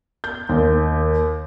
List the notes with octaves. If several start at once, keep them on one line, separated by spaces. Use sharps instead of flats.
G6
D#2